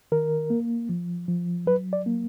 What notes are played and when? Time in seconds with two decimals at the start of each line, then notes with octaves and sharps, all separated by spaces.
0.12 D#3 A#4
0.50 A#3
0.89 F3
1.29 F3
1.67 F#3 B4
1.93 D5
2.06 A#3